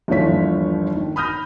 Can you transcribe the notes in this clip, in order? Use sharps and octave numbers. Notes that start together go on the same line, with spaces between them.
G1 D#2 E3 F3 C#5 B6
D#3
B5 D#6 F6 G6 A#6